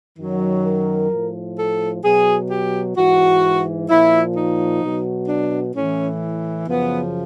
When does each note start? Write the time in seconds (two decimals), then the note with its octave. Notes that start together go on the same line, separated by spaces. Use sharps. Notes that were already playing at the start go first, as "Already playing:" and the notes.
0.19 F#2 D#3 F#3
0.65 A#4
1.12 A2 F3
1.58 A4
2.04 B2 F#3 G#4
2.50 G4
2.96 G#2 E3 F#4
3.89 A#2 F3 E4
4.36 D#4
4.82 B2 F#3
5.28 D4
5.75 A2 E3 C#4
6.67 F#2 C#3 F3 B3